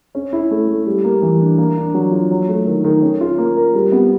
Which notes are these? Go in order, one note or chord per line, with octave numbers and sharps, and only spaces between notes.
C#4
E4
A3
A3
G3
A#3
E3
D4
A#3
D4
F#3
F4
F#3
A3
D#3
D#3
C#4
F4
A#3
A#4
G3
B3